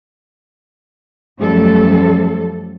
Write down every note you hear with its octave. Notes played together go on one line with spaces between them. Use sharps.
F#2 F3 G3 A3 A4